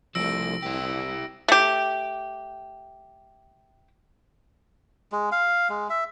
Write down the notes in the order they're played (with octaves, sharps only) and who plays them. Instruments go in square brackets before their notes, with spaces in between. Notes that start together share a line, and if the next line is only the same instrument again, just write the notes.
[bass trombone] C2 [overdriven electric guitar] F3 A3 [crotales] E6 A#6 D7
[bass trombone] C2 [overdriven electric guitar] E4 G4
[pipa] A3 G4
[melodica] G#3
F5
G#3
E5